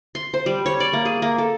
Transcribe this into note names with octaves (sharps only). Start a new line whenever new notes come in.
C6
C5
G3
C#5
D5
A#3
G#4
A#3
A4